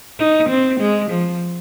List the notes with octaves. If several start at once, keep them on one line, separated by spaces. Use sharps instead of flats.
D#4
C4
G#3
F3